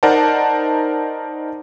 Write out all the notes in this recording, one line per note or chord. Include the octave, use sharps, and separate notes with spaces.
D#4 A#4 C5 D5 F#5 A5